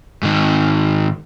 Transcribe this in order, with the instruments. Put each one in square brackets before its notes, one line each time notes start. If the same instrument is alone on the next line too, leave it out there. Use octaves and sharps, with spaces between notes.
[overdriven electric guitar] G#2 D#3